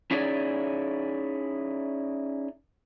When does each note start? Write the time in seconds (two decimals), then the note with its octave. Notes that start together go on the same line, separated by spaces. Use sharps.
0.11 C#4 D#4 E4 G#4 C#5 D5